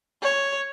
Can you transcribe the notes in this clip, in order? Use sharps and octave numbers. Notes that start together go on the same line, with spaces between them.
C#5